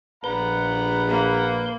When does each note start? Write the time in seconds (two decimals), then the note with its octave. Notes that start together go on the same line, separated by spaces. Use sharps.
0.24 A#1 B4 F#5 A#5 B5 G6
1.09 A#3